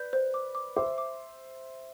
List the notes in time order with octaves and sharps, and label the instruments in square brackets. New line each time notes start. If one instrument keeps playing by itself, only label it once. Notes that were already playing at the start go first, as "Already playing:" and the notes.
Already playing: [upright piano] B4 D5 [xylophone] G6
[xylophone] C5
D6
D6
[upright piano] C5 E5 [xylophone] D6
[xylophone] D6